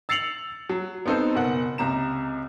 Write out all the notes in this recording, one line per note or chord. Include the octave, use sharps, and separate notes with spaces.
E6 A6 C7 C#7 F7 F#7
F#3
B3 C4 D#4 A4 C5
F#1 B2 F#5
C#2 C3 A#5 E7